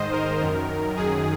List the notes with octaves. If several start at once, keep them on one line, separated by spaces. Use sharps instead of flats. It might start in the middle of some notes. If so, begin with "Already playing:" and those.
Already playing: G#2 D#3 C5 D#5
A#4
F#2 D#3
F#2 D#3 G#4